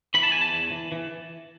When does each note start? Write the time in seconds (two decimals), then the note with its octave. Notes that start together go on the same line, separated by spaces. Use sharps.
0.14 E3 B5
0.23 A5
0.32 E2 G#5
0.41 A5
0.53 E2
0.71 E3
0.92 E3